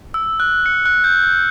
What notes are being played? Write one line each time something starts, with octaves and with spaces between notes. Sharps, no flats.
E6
F#6
C#7
F#6
G6
G6